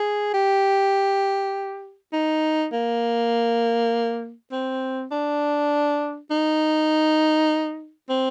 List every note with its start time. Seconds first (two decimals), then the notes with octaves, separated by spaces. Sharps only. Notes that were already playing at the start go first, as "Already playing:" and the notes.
Already playing: G#4
0.34 G4
2.13 D#4
2.72 A#3
4.52 C4
5.12 D4
6.30 D#4
8.09 C4